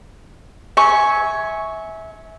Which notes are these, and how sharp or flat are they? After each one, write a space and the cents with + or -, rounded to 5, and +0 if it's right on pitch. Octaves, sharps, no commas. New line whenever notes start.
E5 -20 G#5 +10 C#6 +0